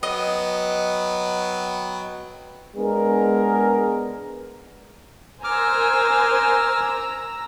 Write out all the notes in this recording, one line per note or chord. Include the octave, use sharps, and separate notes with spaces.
F#3 B3 D#5 G5
G#3 B3 D4 G#4 A#4
A#4 C5 G#5 A#5 D6 E6 F6